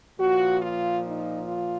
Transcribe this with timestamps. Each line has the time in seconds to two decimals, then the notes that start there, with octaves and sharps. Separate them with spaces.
0.19 A#2 F3 F#4
0.61 F4
1.04 D#4
1.48 F4